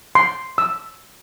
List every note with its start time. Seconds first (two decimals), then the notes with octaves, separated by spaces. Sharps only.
0.15 C6
0.58 E6